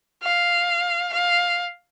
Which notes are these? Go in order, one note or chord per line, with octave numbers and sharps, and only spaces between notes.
F5
F5